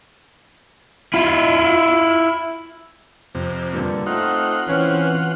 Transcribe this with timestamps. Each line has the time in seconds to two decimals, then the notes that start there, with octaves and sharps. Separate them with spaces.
1.14 E4 F4
3.35 F2 C3
3.73 G2 A#2 D3
4.06 A3 C4 D#4 F4 F#5
4.69 E3 C4 C#4